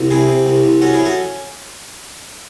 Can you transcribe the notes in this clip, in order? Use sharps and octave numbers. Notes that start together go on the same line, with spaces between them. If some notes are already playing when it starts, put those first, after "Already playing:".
Already playing: C2
C3 E4 G#4
C3
C2
C2
C#4 F#4 A4
E4 G#4
C#4
F#4 A4